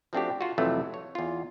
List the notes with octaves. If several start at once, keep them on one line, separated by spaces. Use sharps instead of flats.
F3 A3 C4 D4 F#4 G4
F4 F#4
F2 C3 E3 F#3 A3
C#5
E2 F4